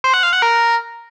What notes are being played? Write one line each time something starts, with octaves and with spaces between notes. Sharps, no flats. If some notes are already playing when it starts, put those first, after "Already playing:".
C5
F#5
F5
F#5
A#4